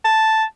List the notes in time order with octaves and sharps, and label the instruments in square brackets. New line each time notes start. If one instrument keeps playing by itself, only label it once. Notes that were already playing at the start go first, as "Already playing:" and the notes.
[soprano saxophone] A5